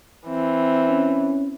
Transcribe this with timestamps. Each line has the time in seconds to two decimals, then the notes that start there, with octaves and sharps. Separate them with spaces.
0.28 E3 C4
0.90 C#4